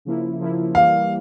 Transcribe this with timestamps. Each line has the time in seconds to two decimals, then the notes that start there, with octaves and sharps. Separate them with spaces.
0.05 C#3 F3 A#3 E4
0.40 C#3 F3 A#3 E4
0.75 E3 G3 A#3 F5